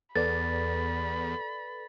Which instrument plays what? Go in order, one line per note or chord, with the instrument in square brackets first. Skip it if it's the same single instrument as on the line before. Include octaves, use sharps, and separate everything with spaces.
[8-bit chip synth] E2 [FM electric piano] A4 B4 D5 [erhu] B5 [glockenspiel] A6